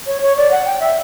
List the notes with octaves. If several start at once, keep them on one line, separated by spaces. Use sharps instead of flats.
C#5
C#5
D5
F#5
G5
E5